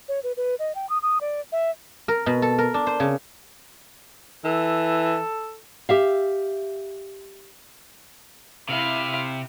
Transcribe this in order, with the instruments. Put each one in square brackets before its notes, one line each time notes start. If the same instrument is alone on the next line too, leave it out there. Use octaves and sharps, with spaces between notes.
[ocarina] C#5
B4
B4
D#5
G5
D#6
D#6
D5
E5
[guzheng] A#4
B2
A4
A#4
D4
C5
C#3
[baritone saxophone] E3 [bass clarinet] A4
[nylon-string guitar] G4 E5 F5
[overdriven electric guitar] C3 [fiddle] E4 F5